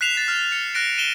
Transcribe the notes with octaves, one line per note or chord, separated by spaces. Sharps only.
F#6 B6 C7 E7 F7
F#6 A6 C7
F6
C#7
F#6 A#6 D7
D#7 E7 G7